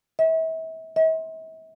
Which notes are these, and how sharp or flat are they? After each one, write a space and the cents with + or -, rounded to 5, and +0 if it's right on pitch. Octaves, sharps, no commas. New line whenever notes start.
E5 -35
E5 -45